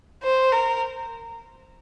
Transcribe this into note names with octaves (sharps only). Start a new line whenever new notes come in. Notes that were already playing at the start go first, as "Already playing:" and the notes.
C5
A#4